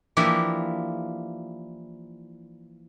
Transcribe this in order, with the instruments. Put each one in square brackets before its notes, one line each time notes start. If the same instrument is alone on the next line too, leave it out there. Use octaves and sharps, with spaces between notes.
[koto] E3 F3 A#3 D4 E4 G4